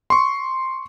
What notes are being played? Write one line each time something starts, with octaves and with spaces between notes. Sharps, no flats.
C6 C#6